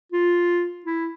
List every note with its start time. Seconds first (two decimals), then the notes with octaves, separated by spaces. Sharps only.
0.12 F4
0.86 E4